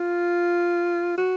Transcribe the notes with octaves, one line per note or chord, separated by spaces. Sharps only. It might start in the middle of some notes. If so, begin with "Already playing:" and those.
Already playing: F4
F#4